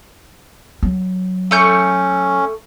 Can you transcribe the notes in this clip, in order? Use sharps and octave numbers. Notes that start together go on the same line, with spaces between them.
F#3
A3 C#4 C#6 G6